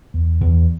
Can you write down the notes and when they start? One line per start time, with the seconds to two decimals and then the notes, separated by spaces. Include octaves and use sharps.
0.14 E2
0.41 E2